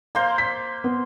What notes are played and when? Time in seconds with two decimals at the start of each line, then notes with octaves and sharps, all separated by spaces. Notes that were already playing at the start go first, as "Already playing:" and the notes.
0.15 A#3 C5 F5 C6
0.38 B6
0.84 B3